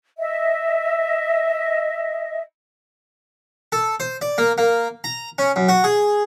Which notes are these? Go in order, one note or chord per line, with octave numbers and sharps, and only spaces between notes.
D#5 E5
A4
C5
D5
A#3
A#3
A#5
C#4
F#2
F#4
G#4